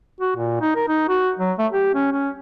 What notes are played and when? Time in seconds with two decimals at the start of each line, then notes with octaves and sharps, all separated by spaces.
0.20 F#4
0.36 A#2
0.61 D#4
0.75 A#4
0.88 D#4
1.08 F#4
1.39 F#3
1.58 A3
1.71 G4
1.94 C#4
2.12 C#4